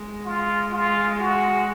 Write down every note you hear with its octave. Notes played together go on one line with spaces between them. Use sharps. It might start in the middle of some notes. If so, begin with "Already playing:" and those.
Already playing: G#3
F4
F4
F#4